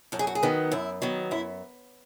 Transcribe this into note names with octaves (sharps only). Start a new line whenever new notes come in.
F#2 A4
G#4
F#4
G#4
D#3 F#3 B3
F#2 E4
D#3 F#3 B3
F#2 E4